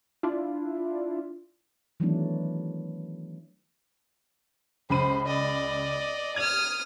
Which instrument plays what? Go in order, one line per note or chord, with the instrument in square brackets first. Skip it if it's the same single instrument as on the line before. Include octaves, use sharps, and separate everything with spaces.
[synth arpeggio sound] D4 E4 F4
[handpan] D#3 E3 F#3 A3 B3 D4
[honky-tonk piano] C#2 B5 D#7 [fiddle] C5
[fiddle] D5 D#5
[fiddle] D#6 F6 [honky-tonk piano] G#6 F7